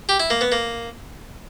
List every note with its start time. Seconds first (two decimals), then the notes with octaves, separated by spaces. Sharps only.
0.09 G4
0.20 E4
0.30 A#3
0.41 B3
0.52 A#3